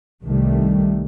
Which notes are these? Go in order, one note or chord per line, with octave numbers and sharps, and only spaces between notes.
C2 C3 D#3 G3 A3